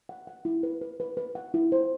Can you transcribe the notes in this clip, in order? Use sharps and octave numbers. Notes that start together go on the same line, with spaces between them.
F#5
F#5
E4
B4
B4
B4
B4
F#5
E4
C5